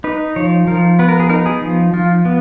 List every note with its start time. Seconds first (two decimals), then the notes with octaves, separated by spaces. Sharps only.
0.04 D#4 B4
0.36 F3 C#5
0.67 F3 A#4
0.99 B3 B4
1.08 A#4
1.20 G#4
1.30 D#4 A#4
1.46 G#4
1.62 F3
1.93 F3 F4
2.25 B3